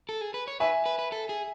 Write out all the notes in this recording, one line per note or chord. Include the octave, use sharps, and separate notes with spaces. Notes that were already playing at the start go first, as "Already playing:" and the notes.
A4
G#4
B4
C#5
B4 E5 G#5
B4
B4
A4
G#4